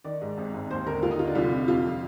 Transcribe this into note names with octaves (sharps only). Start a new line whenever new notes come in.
D#3 D5
G#2
G#1
G#1
D#2 C5
D3 A#4
D#2 F4
D#4
D3 F4
D4
C2 F4
C3
F2 F4
F3